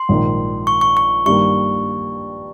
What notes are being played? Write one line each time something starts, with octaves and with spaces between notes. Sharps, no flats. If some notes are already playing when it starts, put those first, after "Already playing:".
Already playing: C6
A#1 G#2 D#3
C#6
C#6
C#6
G2 D#3 A#3 C#6